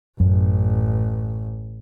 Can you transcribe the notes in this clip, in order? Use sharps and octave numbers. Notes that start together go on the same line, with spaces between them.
A1 F#2